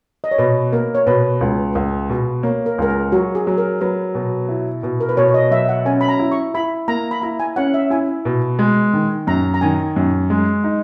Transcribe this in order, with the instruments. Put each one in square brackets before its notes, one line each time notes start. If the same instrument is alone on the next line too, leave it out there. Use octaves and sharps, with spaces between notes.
[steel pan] D#5
C#5
[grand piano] B2 [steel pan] B4
[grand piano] A#3 [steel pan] A#4
[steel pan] C#5
[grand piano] B2 [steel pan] B4
[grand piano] C#2
C#2
B2
[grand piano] A#3 [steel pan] C#5
[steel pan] A#4
[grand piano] C#2 [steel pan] A#4
[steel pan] G#4
[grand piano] F#3 [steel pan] F#4
[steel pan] G#4
[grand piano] F#3
[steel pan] A#4
[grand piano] F#3 [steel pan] B4
[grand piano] B2
E4
B2
[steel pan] A#4
B4
[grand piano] B2 [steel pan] C#5
[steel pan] C#5
D#5
[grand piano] F#3 [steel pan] E5
[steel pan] F#5
[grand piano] C#4 [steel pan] G#5
[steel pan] B5
A#5
[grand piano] E4
[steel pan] C#6
[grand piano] E4 [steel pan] B5
[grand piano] A#3 [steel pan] A#5
[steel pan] B5
[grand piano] E4 [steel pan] A#5
[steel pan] G#5
[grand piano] C#4 [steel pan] F#5
[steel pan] E5
[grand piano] E4 [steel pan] G#5
[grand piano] B2
G#3
D#3
[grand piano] F#2 [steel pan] A#5
[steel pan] A#5
[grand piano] D#3 [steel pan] G#5
[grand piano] F#2
G#3
D#4